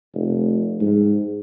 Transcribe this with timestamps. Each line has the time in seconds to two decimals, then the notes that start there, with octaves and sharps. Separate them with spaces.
0.14 F1
0.81 G#2